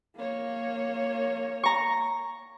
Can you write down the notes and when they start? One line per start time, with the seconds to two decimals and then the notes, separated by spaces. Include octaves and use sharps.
0.16 A#3 C#5
1.63 A#5 C#6